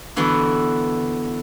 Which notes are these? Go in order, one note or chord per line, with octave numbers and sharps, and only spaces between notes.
D3 E3 B3 D4 F#4